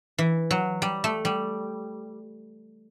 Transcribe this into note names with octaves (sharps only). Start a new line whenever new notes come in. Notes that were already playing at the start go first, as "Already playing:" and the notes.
E3
F#3
G3
A3
G3